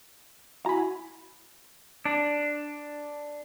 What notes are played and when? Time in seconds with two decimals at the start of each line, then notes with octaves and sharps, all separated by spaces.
0.66 E4 F#4 G#5 A#5 B5
2.05 D4